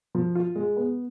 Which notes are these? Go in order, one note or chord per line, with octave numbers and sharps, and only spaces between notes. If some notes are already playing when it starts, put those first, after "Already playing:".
F3
F4
G#3
B3